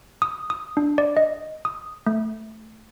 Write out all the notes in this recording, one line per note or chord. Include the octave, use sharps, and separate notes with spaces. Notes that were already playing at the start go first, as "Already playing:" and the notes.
D#6
D#6
D4
D5
D#5
D#6
A3